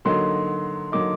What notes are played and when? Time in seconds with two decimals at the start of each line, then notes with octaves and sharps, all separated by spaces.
0.05 D3 F#3 A#3 D#4 C6
0.92 D3 F#3 A#3 D#4 D6